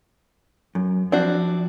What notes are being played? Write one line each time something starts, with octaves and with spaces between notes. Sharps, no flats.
F#2
F3 C4 D4 E4 F#4